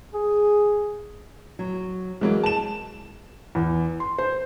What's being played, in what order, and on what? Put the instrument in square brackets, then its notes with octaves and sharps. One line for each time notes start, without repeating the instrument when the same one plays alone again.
[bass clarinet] G#4
[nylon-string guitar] F#3
[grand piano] E3 F#3 A#3 [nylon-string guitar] G#3
[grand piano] A5 E7
[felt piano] E2
C6
C5